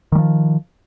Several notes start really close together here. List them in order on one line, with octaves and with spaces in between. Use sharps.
D#3 G3 F3